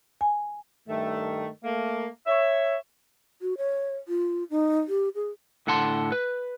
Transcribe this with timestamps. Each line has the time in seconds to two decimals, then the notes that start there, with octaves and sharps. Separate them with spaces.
0.21 G#5
0.88 G2 D#3 A3
1.63 A3 A#3
2.25 C#5 E5
3.42 F#4
3.58 C#5
4.08 F4
4.50 D#4
4.88 G4
5.15 G#4
5.67 A2 D3 F#5 A5 C6
6.12 B4